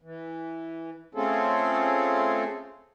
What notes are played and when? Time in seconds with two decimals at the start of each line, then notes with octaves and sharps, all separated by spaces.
0.02 E3
1.15 A3 C4 C#4 F4 G#4 A4